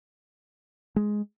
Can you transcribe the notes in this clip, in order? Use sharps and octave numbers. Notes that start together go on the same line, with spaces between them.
G#3